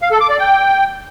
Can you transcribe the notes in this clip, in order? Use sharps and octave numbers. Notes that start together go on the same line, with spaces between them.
F5
A4
D6
D5
G5